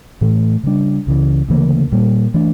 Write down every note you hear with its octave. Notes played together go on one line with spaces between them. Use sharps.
A2 E3 A3
C#3 G3 D4
C#2 C#3 E3
D2 C#3 E3 A#3
A#2 G3 A#3
E3 A3 D4